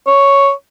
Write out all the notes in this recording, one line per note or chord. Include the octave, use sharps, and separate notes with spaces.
C#5